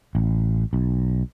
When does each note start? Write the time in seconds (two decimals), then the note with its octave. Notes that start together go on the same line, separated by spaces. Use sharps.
0.15 A1
0.73 B1